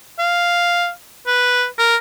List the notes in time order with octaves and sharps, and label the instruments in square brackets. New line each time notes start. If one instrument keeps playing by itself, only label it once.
[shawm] F5
B4
A#4